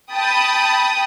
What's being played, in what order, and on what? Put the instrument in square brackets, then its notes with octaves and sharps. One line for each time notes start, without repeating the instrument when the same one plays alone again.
[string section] G5 A5 B5 D#6